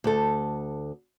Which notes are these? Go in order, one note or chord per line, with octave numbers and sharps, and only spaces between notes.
D2 A4